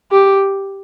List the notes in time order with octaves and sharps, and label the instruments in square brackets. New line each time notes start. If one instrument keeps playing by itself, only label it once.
[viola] G4